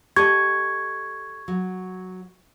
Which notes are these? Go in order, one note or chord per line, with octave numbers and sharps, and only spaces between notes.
G4 A4 D#5 C#6 G#6
F#3